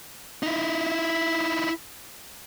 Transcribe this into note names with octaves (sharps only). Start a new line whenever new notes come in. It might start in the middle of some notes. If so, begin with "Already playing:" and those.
D#4 E4